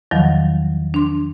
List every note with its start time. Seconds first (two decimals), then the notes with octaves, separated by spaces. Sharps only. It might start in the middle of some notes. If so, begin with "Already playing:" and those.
0.11 E2 D#3 F3 F#3
0.94 D4 C6